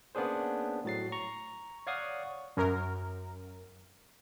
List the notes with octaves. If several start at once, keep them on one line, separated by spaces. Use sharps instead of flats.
A#3 B3 C#4 D4 G#4 C5
A2 F#3 A6 C7
A#5 C#6
C#5 D5 F5 F#5 C#6 D#6
F#2 A#4